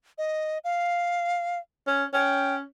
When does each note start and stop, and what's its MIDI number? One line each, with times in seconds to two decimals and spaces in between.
0.18 0.58 75
0.64 1.59 77
1.87 2.05 61
2.13 2.62 61
2.13 2.55 79